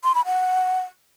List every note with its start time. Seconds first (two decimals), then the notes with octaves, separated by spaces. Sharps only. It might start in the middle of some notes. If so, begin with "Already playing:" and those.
0.04 C6
0.15 B5
0.26 F#5